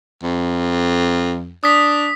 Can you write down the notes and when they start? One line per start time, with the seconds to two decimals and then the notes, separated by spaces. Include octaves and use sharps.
0.23 F2
1.64 D4 D#6 B6